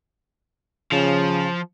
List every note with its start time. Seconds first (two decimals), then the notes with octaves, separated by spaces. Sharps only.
0.92 C#3 F3